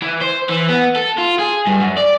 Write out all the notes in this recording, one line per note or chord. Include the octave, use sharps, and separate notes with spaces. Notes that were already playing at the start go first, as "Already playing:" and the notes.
E3
C5
E3
B3
A4
F4
G#4
G2
F#2
D5